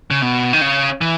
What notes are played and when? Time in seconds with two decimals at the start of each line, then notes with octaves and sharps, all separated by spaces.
0.11 C#3
0.22 B2
0.53 D#3
0.61 C#3
1.01 E3